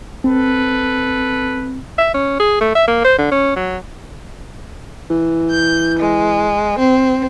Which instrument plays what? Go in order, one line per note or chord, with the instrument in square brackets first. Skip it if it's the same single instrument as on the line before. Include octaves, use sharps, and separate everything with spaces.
[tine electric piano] C4 [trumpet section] A4 B4
[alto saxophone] E5
C#4
G#4
A3
E5
A#3
C5
D3
C#4
F#3
[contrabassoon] E3
[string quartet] G6
G#3
C4